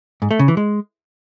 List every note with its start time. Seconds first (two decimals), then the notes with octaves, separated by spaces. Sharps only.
0.22 G#2
0.31 A3
0.39 C#3
0.48 E3
0.57 G#3